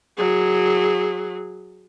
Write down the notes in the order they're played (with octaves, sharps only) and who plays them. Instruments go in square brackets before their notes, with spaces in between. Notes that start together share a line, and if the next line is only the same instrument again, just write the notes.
[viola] F#3 G#4